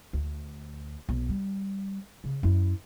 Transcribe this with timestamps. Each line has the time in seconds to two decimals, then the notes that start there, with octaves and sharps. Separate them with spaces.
0.13 D2
1.09 B1
1.29 G3
2.24 C#3
2.43 F#2 E4